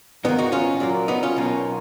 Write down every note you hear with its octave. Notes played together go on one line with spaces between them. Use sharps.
G#2 D#3 A#3 B3 D#4
D#4 F#4
C#4 F4
A#2 F#3 A#3
B3 D#4
C#4 F4
B1 B2 A#3